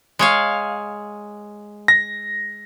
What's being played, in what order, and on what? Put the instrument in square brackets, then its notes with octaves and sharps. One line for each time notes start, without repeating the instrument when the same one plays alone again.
[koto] G#3 C#5 F5
[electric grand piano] A#6